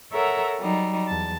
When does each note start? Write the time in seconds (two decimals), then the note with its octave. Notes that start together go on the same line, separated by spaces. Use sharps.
0.11 A4 A#4 C#5 E5 F#5 A#5
0.58 F#3 G3 D#4
1.07 E2 A5